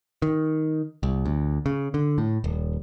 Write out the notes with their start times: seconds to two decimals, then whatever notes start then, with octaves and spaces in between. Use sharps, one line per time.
0.22 D#3
1.03 C2
1.26 D2
1.66 C#3
1.94 D3
2.18 A2
2.44 D#1